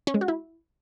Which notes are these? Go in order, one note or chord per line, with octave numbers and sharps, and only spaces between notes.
C#4
G#3
F#4
E4